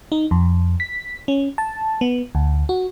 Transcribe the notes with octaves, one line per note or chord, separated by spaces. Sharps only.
D#4
F2
B6
C#4
A5
B3
D2
F#4